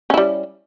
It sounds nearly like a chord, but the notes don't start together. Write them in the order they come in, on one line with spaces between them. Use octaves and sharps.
C#4 E4 G3